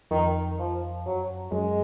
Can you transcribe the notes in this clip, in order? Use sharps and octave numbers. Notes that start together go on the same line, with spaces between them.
F2 D#3
F3
F#2 F#3
F#2 G#3